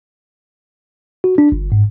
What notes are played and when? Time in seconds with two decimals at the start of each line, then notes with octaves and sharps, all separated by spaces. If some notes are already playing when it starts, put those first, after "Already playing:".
1.24 F#4
1.38 D4
1.52 G1
1.72 G#2